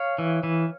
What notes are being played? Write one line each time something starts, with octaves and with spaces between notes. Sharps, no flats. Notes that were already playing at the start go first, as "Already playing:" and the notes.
Already playing: C#5 F5
E3
E3